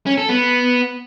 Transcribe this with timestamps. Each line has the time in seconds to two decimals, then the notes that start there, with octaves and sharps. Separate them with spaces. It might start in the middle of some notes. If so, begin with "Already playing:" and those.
0.06 C#4
0.18 A4
0.29 B3